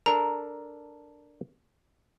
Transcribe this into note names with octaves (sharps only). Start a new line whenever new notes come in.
D4 A4 A#4 A#5